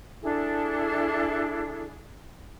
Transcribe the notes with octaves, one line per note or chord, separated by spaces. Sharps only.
D4 E4 G#4 A4